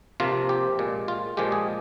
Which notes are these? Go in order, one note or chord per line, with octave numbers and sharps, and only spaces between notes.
C3 F3 A#3 F4
G4
A#2 G#3
F4
A#2 F3 G#3 G4
G#4